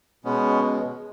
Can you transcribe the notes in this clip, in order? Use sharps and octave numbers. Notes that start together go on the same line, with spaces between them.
B2 G#3 B3 C#4